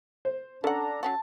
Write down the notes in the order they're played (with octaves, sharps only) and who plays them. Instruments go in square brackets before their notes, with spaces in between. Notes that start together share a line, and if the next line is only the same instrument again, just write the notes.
[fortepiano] C5
[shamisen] C#4 F#5 [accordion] D4 A#5 [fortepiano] A4
[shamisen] F#3 C#4 F#4 [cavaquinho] A5